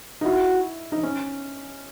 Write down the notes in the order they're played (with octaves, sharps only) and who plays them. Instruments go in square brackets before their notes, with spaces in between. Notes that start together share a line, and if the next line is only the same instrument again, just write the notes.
[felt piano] D#4
[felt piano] E4 [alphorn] F#4
[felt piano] D#4
C#4